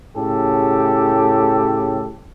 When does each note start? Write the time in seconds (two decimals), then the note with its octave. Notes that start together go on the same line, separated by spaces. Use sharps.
0.16 A2 C#3 G4 A4